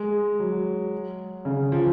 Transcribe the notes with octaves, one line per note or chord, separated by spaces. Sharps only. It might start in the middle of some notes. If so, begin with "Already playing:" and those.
Already playing: G#3
F#3
C#3
F3